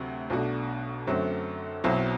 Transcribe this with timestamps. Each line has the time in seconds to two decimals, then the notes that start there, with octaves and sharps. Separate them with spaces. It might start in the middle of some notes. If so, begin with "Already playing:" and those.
Already playing: D2 C3 F#3
0.30 B1 B2 A3 D4 F#4
1.07 F#2 D3 F#3 A3 C4
1.84 B1 B2 F#3 C4 E4